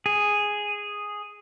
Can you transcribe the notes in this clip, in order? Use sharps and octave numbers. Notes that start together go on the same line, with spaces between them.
G#4